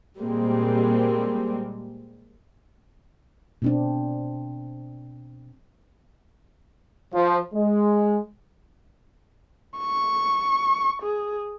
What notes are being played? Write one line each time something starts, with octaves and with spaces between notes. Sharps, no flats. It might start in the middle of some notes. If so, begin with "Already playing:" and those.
A#2 G3 G#3 A#3 C4
B2 C4 D4
F3
G#3
C#6
G#4